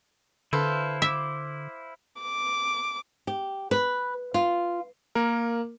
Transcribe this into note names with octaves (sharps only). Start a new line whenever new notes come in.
D3 E4 A4 B4 C5 F5
E5 D6
D6
G4
B4
F4
A#3 A#4